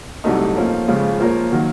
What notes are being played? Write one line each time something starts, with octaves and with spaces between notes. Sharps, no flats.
C2 C3 F#3 A3 D#4
F3 A#3 C#4 A4
C#2 C#3 F3
F3 A#3 F4 A#4 C#5
D#3 F#3 A#3